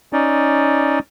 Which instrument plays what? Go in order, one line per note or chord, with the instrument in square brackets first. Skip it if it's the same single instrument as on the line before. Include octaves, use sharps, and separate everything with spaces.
[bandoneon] C#4 D#4 D5